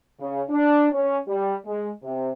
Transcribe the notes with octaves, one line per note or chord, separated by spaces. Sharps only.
C#3
D4
C#4
G3
G#3
C3